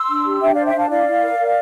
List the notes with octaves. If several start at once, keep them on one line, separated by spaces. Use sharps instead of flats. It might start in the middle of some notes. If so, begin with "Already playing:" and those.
Already playing: C6 E6
D4
G4
D4 E5 G5
C5 D5 F5
E5 G5
D4 F5 A5
E4 D5 F5
E4
A#4
A#4